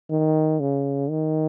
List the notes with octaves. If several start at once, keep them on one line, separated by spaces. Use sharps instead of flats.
D#3
C#3
D#3